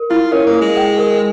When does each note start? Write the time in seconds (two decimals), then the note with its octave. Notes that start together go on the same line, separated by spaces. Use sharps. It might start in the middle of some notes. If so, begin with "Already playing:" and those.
Already playing: A#4
0.10 E4 F4
0.32 C#4 A#4
0.47 A#3
0.54 A#4
0.61 G#3
0.77 G5
0.98 A#4